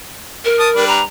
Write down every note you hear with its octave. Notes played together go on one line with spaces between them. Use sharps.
A#4
A5 D#6
G3 D4 B4
A#5